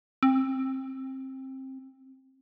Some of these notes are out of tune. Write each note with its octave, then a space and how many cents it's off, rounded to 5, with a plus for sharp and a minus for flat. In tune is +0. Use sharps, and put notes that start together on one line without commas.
C4 +20